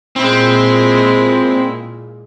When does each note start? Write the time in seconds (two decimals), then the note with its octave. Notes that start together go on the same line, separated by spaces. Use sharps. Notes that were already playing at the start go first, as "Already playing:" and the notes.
0.16 A#2 G#3 C4 E4